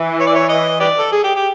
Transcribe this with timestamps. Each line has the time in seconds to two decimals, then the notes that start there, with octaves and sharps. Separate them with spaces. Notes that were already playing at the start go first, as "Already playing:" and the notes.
Already playing: E3
0.20 C#5
0.27 D5
0.35 C#5
0.49 D#5
0.80 G4 B4 D5
0.98 A4
1.12 G#4
1.24 G4
1.36 G4